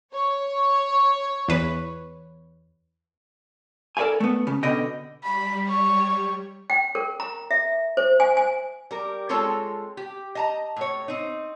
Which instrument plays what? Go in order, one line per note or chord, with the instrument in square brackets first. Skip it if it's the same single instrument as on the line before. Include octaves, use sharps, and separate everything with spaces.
[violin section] C#5
[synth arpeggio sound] E2 B4
[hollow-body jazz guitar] A4 A#4 D5 F5 G#5
A3 B3
C#3
B2 D3 D#5 G5
[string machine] G3 [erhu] B5
[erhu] C#5
[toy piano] G5
A#4
A#5
E5
C5
G#5
G#5
[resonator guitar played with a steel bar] G3 A#4
G#3 C4 F4 A4 C#5 A5
G4
D#5 A5 A#5
A2 C#5
C4 D#4